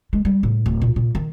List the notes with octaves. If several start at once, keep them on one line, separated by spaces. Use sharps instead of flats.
G#3
G3
A2
D1
A#2
A#2
D#3